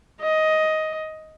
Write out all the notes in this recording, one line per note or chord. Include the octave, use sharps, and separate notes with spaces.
D#5